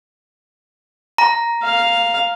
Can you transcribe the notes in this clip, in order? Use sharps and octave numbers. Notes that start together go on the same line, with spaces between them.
A#5
F5